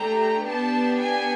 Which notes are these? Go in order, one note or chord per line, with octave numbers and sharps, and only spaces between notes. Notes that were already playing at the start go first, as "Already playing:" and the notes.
Already playing: A3 D4 G4 A#5
B3 D4 G4 A5
G#5